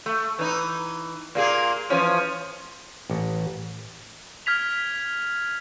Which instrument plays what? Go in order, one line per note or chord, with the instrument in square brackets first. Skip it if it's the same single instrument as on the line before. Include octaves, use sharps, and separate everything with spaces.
[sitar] A3
E3 D#4
A#2 A#3 G#4
E3 F3 C#4
[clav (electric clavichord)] A1
[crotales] F6 G#6 B6 F7